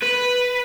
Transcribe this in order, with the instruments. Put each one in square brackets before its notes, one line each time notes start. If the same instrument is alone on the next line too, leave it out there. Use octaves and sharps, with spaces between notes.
[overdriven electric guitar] B4